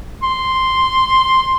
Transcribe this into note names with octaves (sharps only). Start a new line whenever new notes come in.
C6